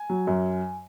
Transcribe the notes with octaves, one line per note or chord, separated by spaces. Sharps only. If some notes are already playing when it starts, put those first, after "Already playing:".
Already playing: G#5
F#3
F#2